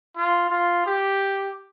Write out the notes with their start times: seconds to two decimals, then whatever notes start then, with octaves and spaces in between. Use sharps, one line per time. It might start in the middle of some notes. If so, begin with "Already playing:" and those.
0.16 F4
0.50 F4
0.86 G4